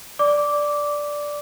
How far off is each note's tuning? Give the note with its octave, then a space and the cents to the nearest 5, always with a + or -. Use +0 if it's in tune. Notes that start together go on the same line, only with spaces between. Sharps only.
D5 +0 D6 -10